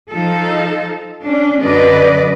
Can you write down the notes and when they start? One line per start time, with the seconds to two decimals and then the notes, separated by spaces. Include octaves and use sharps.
0.11 F3 D#4 A4
1.26 C#4 D4
1.63 F#2 D3 F#3 B4 D5 D#5